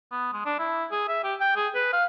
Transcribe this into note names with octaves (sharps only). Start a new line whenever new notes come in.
B3
G#3
D4
E4
G#4
E5
G4
G5
G#4
B4
F5